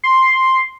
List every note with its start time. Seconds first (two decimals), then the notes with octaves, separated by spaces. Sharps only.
0.04 C6